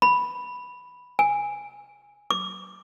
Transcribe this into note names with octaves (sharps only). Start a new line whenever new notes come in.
B5
G#5
D6